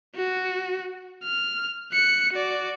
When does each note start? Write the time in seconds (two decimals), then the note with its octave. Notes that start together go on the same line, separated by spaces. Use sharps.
0.15 F#4
1.24 F6
1.93 F#6 C#7
2.33 F#4 D5